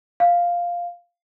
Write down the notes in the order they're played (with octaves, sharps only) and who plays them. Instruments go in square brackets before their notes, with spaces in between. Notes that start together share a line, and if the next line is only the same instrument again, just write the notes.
[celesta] F5